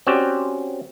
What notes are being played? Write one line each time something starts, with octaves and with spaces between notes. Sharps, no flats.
C4 C#4 F#4 G4 D5